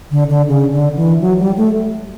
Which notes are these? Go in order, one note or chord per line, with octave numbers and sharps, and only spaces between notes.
D3
D3
C#3
D3
E3
F#3
G3
A3